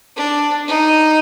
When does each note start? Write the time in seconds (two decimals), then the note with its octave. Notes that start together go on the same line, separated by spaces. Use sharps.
0.16 D4
0.67 D#4